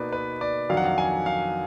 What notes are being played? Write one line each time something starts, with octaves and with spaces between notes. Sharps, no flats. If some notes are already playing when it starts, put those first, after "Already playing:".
Already playing: B2 A#3 D#4 B4 D5
B4
D5
F2 D#3 F#3 D4 F5
F#5
F5
G#5
F5